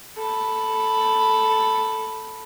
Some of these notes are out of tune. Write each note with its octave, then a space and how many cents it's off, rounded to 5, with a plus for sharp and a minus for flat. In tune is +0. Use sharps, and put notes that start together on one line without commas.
A4 +0 B5 +0